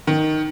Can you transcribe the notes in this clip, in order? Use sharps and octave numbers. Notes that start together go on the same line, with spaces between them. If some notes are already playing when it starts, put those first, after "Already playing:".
D#3